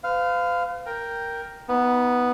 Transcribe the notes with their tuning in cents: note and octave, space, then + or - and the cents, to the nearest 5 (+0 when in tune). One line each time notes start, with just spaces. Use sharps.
B4 +45 F5 +0
A#4 +0 G5 +0
B3 +0 D#4 +30